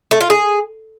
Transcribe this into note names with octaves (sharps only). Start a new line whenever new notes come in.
A3
F4
G#4